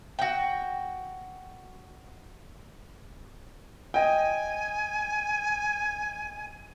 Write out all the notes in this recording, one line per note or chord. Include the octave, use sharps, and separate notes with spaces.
F#4 G5
D#5 G5 G#5